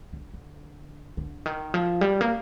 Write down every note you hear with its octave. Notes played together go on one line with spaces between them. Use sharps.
D3
D3
D3
D#3
F3
G3
A#3